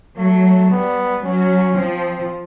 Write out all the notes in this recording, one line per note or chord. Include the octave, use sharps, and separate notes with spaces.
F#3 A3
G3 B3
F#3 C#4
F3 C4